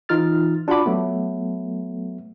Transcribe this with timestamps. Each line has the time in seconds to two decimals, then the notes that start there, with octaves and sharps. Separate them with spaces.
0.09 E3 D#4 F4 F6 A6
0.68 D4 F4 F#4 F#5 B5 D6
0.86 F#3 A3 B3